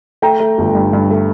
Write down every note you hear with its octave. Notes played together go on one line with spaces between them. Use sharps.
A3 G5 A#5
A3
G1
G2
G2
A3